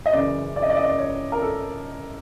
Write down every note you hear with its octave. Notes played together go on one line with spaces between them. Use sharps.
D#5
F#2 C#3 E3 D5
D5
D#5
D5
D#5
D5
C#5
A#4
A4